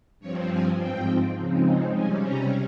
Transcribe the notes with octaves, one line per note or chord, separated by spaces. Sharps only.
G2 F3 C4 C#5
G#5
G#2 F3 C4 G5
C#3 F3 G#3 C4 D#4
C3 G3 C#4 G#5
A#5